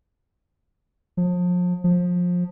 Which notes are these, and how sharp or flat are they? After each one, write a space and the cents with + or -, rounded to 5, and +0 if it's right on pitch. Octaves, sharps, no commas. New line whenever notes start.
F3 +35
F3 +25